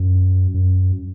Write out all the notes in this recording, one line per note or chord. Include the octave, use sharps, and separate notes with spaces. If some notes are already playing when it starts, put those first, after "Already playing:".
Already playing: F#2
F#2